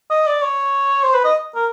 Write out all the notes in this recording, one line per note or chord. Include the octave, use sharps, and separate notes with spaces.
D#5
D5
C#5
C5
B4
D#5
A#4